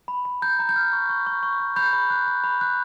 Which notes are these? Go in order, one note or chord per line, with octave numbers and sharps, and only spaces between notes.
B5
B5
A#5 G6
A#5
G6
F6
C#6
C#6
C#6
C#6
C#6
B5 G6
B5
F#6
B5
B5
F#6